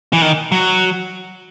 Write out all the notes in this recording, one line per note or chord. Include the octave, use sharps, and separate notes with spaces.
E3
D#3
F#3